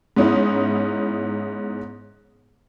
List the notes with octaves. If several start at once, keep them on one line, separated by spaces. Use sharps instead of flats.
G#2 B3 C#4 D#4 E4